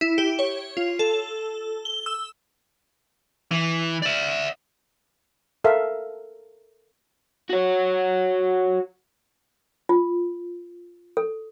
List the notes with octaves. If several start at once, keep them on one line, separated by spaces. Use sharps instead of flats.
E4
G4
C#5
F4
A4
G7
E6
E3
D5 E5
A4 A#4 E5 F5
F#4 C#5
F4
A4